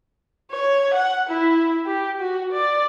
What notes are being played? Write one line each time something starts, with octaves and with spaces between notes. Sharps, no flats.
C#5
F#5
E4
G4
F#4
D5